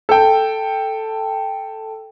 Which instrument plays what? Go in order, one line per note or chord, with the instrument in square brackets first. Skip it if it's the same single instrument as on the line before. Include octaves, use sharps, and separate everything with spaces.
[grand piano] A4 G5